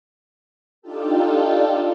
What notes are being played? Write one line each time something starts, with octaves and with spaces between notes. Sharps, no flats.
D4 D#4 F4 G4 A4